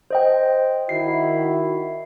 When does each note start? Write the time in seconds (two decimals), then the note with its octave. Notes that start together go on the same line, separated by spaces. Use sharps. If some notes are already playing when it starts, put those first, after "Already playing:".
0.10 C5 D#5 G5
0.89 D#3 E4 F#4 C7